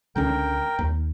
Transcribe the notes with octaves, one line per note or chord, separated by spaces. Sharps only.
C#2 D3 C#4 A#4 G5
D#2